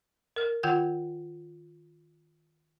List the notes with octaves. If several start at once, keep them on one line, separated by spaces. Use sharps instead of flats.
A#4 F6
D#3 F4 F#5 G5 G6 G#6